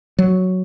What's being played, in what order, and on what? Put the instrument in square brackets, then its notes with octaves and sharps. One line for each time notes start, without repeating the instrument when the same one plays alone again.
[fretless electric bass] F#3